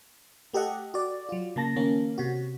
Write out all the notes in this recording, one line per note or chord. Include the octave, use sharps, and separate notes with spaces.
A3 G4 A4 D#5 F#5
F#4 D5
F#3 F4
C#3 A#3 A5 A#6
D#3 A#3 C#4
C3 F#4